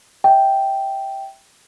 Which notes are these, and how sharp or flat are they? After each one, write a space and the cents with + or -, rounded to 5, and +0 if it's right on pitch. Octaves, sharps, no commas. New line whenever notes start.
E5 -15 G5 -5